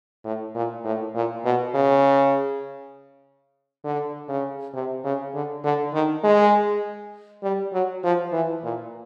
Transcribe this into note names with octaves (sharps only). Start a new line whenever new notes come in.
A2
A#2
A2
A#2
B2
C#3
D3
C#3
C3
C#3
D3
D3
D#3
G#3
G3
F#3
F3
E3
A#2